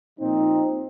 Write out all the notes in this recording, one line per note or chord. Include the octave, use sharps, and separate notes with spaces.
A#2 F3 C4 D#4